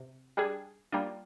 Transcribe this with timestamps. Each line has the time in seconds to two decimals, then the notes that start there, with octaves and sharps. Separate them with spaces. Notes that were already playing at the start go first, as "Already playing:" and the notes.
Already playing: C3
0.37 G3 D4 G#4
0.92 G3 A#3 D4 F4